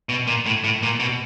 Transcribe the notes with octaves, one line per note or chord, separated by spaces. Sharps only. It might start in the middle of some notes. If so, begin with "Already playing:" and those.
B2
A#2
A2
A2
A#2
B2